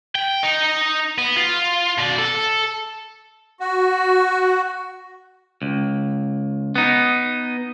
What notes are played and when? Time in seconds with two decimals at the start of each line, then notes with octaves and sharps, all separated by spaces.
0.15 G5
0.43 D#4
1.18 B3
1.36 F4
1.98 B2 D5
2.19 A4
3.60 F#4
5.62 C#2
6.75 B3 D#4